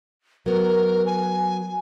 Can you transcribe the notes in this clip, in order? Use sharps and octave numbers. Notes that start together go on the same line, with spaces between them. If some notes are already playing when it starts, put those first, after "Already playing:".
F#3 B3 A#4
G#5